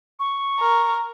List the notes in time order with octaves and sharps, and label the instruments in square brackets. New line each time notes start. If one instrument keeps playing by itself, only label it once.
[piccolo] C#6
[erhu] A#4